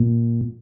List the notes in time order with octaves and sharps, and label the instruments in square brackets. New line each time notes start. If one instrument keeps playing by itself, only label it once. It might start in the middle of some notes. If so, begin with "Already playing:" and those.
Already playing: [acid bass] A#2